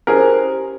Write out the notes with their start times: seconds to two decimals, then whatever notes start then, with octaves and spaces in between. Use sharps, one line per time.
0.07 C#4 E4 G4 G#4 A#4 C5